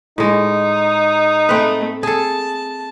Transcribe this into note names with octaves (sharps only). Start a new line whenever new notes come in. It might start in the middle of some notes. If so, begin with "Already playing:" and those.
A2 G#3 D#4
A3 C4 B4
G#4 A4 A5